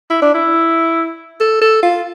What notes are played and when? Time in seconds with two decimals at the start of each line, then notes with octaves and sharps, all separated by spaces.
0.10 E4
0.22 D4
0.34 E4
1.40 A4
1.62 A4
1.83 F4